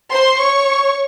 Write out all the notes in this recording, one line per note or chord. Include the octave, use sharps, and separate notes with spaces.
C5 C6
C#5 C#6